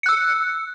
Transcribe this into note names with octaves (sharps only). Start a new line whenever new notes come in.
E6 F#6 C#7